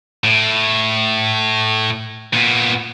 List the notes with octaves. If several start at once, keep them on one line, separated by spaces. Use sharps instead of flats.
A2
A#2 B3